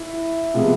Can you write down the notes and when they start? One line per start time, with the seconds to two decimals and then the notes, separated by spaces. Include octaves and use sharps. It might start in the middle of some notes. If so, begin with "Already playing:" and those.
Already playing: E4 E5
0.54 C3 F3 G#3 B3